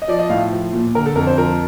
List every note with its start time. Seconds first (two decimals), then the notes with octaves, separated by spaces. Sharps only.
0.02 D#5
0.08 F3 D5
0.19 D#5
0.30 A2 F5
0.52 F3
0.73 A#2
0.95 D3 A#4
1.06 A4
1.15 F2 A#4
1.27 C5
1.38 F3 A#4